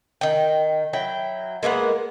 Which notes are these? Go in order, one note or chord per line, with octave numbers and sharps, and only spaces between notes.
D#3 G5
F#3 E4 G5
G#3 A#3 B3 F#5